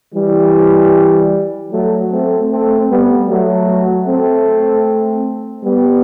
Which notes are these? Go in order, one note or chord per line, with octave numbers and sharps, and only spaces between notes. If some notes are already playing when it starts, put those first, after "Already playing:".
E3 G3
F#3 A3
A3 C4
A3 C4
G3 B3
F#3 A3
A3 C4
G3 B3